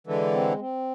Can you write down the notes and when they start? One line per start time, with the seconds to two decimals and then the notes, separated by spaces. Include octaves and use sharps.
0.07 D3 E3 G#3
0.33 C4
0.59 C4